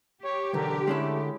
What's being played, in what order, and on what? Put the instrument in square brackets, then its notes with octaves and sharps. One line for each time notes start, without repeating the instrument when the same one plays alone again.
[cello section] G4 [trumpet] C#5
[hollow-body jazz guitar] B1 E2 [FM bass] D3 [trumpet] A#4
[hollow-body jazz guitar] G#3 C#4 E4 [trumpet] A3